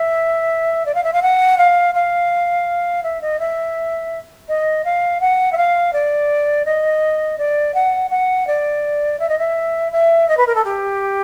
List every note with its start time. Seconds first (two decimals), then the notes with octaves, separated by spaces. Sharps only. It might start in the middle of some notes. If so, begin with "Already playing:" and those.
Already playing: E5
0.85 D5
0.94 F5
1.03 E5
1.13 F5
1.22 F#5
1.57 F5
1.94 F5
3.03 E5
3.21 D#5
3.39 E5
4.48 D#5
4.84 F5
5.20 F#5
5.52 E5
5.56 F5
5.93 D5
6.65 D#5
7.38 D5
7.74 F#5
8.10 F#5
8.47 D5
9.19 E5
9.28 D#5
9.38 E5
9.91 E5
10.28 D#5
10.37 B4
10.46 A#4
10.55 A4
10.64 G4